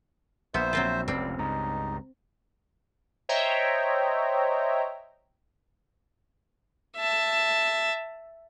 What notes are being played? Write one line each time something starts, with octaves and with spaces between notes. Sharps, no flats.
A#1 B3 C5 E5
F#3 C4 F4
F1 C#2 C4 D5
C#2 G2 D#4
C5 C#5 D#5 E5 G5 A#5
E5 A5